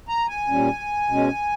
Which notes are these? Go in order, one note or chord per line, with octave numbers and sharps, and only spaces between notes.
A#5
G#5
A#2 G3 C#4
B2 G#3 C#4